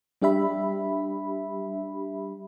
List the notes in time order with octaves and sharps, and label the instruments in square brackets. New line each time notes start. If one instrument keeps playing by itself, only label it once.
[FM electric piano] G3 D4 G4 E5 B5